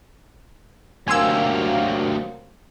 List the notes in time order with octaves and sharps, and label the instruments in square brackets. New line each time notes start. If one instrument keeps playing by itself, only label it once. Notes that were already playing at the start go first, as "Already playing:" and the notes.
[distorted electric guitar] D2 G4 [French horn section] C3 F#3 A#3 [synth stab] G#5 C6 E6